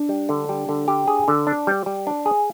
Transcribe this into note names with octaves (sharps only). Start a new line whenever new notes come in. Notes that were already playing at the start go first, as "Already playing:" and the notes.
Already playing: D4
G3
D3
G3
D3
G4
G#4
D3
D4
G3
G3
D4
G#4